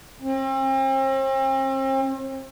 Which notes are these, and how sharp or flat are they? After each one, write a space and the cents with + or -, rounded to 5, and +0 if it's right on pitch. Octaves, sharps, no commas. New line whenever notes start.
C4 +40